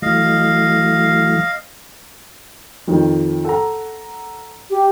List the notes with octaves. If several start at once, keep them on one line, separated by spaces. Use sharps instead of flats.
E3 F#3 A3 D#5 F5
F2 D#3 F3
A4 F#5 A#5
G4